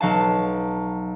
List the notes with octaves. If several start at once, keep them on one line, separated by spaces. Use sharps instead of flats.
B1 F#3 F5 A5